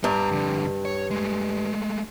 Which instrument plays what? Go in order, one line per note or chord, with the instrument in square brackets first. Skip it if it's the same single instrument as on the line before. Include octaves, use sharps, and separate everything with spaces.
[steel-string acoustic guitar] G2 [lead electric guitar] B3 A#5
[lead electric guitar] F2 D3
C#5
G#3 A3